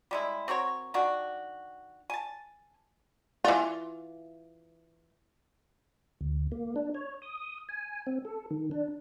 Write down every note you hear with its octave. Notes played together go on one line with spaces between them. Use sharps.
G3 G#3 E4
C4 F#4 A#4 C#5
D#3 D4 F#4
G#5 A5
E3 F4
D2
A#3
D4
C#5
D#6
G#5
C4
A4
D#3
D4